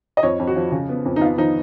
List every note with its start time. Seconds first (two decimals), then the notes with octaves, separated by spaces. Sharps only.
0.17 D#5
0.23 F2 C#5
0.39 F2
0.47 F#4
0.56 F3
0.72 C#3
0.89 B3
1.05 F2
1.16 D#4
1.21 B3 F4
1.38 F3 D#4